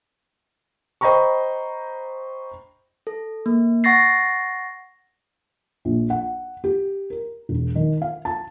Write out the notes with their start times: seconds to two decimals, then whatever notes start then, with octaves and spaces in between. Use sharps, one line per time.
1.01 C5 D#5 G5 A#5 B5 C#6
3.07 A4
3.46 A#3
3.84 F#5 C#6 A6 A#6 C7
5.85 A#1
6.10 F#5
6.64 G4
7.10 A#4
7.49 E1
7.75 D#3
8.02 F5
8.25 A5